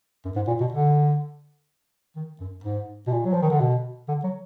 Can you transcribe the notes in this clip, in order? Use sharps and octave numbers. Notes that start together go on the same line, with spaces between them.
F#2
G#2
A#2
B2
D3
D#3
F#2
G#2
B2
A#2
F#3
F3
D#3
D3
B2
D3
F#3